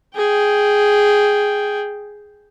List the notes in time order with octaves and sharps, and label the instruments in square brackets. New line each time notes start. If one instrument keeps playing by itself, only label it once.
[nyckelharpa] G#4 G5